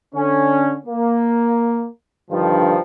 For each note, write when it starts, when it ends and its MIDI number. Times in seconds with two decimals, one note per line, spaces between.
0.14 0.75 50
0.14 0.75 61
0.86 1.87 58
2.31 2.79 43
2.31 2.79 50
2.31 2.79 51
2.31 2.79 53